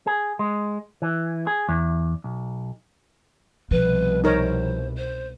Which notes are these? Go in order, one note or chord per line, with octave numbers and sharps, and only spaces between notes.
G#4
G#3
E3
G#4
E2
B1
C2 B2 F3 B4
D#4 A#4 C5 C#5
C5